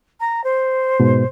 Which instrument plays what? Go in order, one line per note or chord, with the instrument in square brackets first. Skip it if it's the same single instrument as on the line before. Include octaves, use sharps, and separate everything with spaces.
[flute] A#5
C5
[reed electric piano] G#2 B2